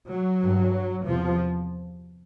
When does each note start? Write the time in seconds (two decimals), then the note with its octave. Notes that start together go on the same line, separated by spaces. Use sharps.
0.10 F#3
0.42 G2
1.06 E2 C3 F3